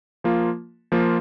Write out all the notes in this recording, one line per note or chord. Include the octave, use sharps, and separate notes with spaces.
F3 A#3 F4
F3 A#3 F4